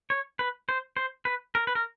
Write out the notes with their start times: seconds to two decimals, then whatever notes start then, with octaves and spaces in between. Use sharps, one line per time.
0.10 C#5
0.39 B4
0.69 C5
0.97 C5
1.25 B4
1.55 A#4
1.67 B4
1.75 A#4